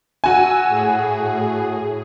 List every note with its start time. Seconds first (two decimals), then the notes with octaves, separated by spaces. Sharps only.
0.24 F#4 G#5 E6
0.68 A2 G#4